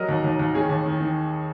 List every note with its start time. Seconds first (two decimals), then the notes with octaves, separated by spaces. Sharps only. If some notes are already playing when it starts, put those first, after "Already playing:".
Already playing: F#3 A#4 D#5
0.09 D#2
0.24 D#2
0.39 D#2
0.54 D#3 G#4 C#5
0.69 D#2
0.86 D#3
1.00 D#3